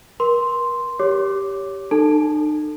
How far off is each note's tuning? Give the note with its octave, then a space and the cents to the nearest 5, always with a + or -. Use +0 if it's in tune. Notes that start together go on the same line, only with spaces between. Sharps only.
A#4 +40 C6 +0
G4 +0 C#5 +15 D6 +0
D#4 -40 A4 +15 A5 +0